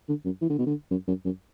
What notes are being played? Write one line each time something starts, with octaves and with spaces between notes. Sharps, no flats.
D3
F#2
E3
D3
B2
D3
F#2
F#2
F#2